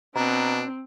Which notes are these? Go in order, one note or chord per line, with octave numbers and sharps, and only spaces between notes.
B2 C4 D4 A#5